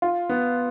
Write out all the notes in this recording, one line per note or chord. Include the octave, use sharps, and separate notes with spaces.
F4
B3